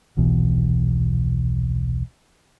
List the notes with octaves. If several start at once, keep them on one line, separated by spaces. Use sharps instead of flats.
D#1 B1 B2 E3